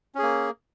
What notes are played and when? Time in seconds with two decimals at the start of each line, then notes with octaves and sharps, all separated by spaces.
0.15 C#4
0.19 G#4
0.23 A#3